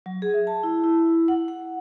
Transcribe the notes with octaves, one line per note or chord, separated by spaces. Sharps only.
F#3
G#4
E5
A5
E4
E4
F#5
F#5